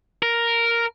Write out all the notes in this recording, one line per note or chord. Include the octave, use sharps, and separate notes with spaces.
A#4